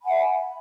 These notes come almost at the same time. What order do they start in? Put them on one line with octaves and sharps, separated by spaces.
B5 G#5 F#5 E5